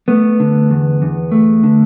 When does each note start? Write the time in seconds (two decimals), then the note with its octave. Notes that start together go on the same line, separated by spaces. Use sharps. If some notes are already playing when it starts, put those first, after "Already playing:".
0.08 A3 B3
0.40 D3
0.70 E2
1.02 E2
1.32 A3
1.63 D3